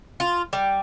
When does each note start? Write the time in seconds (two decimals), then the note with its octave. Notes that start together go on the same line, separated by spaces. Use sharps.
0.20 F4
0.53 G3